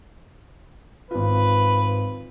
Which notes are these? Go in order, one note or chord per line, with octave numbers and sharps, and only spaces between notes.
G#1 F4 B4